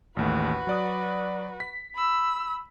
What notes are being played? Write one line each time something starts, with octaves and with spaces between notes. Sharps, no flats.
A1 D#2 A3 F#4 B4
F#3 D5 D#6
B6
B5 E6